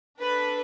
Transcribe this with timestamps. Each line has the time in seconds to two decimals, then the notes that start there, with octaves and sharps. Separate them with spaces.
0.20 D4 A4 B4